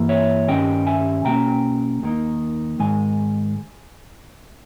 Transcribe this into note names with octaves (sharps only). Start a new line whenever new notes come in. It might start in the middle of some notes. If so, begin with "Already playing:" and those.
Already playing: G2 E3 A#3
C#5 E5
G2 D#3 G3 C#4 D#5 G5
E5 G#5
B2 A#3 C#4 G5 A#5
D#2 D#3 A#3 D#4
G#2 D#3 G#3 G#5